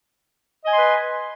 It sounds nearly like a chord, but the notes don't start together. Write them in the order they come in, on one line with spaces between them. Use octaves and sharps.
D#5 G#5 C6 B4